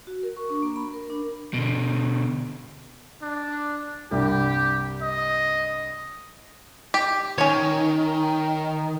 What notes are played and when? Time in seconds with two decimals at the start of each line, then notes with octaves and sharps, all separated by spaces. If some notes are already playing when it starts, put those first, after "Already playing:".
0.07 F#4
0.23 A#4
0.37 C#6
0.50 D4
0.62 A#3
0.76 B5
0.94 A#4
1.10 D4
1.54 B2 D3
3.22 D4
4.11 C2 G2 G3 G4
5.02 D#5
6.94 G4
7.38 D#3 C#4 C#5